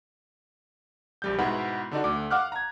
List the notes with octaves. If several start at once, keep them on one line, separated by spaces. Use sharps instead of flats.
A#1 G3 G6
G#2 B2 E4 B4 F#5 B5
D3 D4 D#4 F#4
D2 D6
F5 F#5 D6 F6 F#6
A#5 G#6